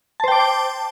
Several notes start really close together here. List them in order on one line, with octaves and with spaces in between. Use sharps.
A5 C5 G5 D6